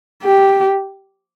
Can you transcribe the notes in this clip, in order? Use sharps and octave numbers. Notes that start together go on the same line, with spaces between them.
G4